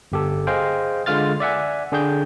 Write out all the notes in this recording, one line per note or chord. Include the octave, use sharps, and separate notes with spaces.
G1 G4 A4
G#4 C5 D#5 F5 G5
D3 G#3 F4 F6 A6
D5 E5 F#5 G#5
D3 D4 G#4 G5 G6